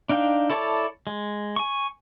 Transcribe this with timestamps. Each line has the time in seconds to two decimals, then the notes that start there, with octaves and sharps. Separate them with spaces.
0.09 D4 D#4 F5 G5
0.50 E4 A4 C#5 D5 A5
1.07 G#3
1.56 G#5 C#6